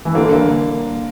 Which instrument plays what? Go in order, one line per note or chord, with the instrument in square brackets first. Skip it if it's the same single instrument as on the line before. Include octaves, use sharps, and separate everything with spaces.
[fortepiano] E3
[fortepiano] D3 [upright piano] A#3
[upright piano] A#3